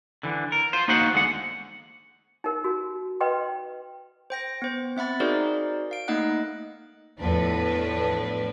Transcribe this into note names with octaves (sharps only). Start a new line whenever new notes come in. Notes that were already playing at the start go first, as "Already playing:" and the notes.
D3 E3
A#4
F4 C5
A#3 D#4 F#4 C5 F5 F#5
E2 D3 G#3 F#5
D#4 A#4
F#4
B4 D#5 G5 C6
C5 G5 A#6
B3 C5
C4 E5 F#5 B5 A6
D#4 F#4 G#4 A#4 C5 D5
F5 D7
A3 A#3 D#4 D#5 F#5 F#6
E2 A2 F3 D4 B4